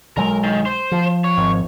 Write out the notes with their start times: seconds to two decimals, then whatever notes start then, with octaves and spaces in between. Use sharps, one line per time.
0.17 B1 F#3 G#3 A#4
0.44 D#3
0.66 C5
0.92 F3
1.24 C#5
1.37 G#1